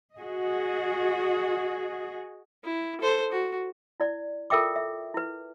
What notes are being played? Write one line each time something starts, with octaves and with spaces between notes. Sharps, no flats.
F#4 G#4 D#5
E4
A4 C5
F#4
E4 D5
F4 A4 A#4 E5 G5 D6
E5
E4 B4